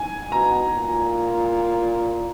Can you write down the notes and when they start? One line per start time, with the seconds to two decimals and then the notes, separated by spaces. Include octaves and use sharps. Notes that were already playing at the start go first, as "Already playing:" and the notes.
Already playing: G#5
0.32 B2 A#5
0.77 A#2